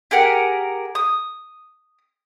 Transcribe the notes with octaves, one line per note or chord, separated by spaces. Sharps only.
G4 G#4 A#4 F#5
D#6